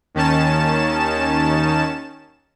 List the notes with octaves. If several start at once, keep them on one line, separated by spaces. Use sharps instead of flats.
D#2 D#3 C#4 A5 E7